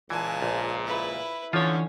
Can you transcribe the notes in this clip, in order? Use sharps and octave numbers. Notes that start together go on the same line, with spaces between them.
C#2 A#2 E3 G#5 A5
A#1
E4 B4
D3 E3 F3 C#4 F4 C#5